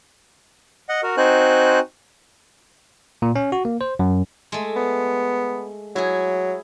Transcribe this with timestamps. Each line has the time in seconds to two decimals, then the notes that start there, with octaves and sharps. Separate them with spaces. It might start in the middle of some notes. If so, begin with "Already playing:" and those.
0.89 D#5 F#5
1.03 F#4 A#4
1.17 C4 D#4 F#4 C5 G#5 F#6
3.22 A#2
3.35 C#4
3.52 F#4
3.65 A#3
3.81 C5
3.99 F#2
4.52 G#3 A3
4.76 B3
5.96 F#3 E4 G#4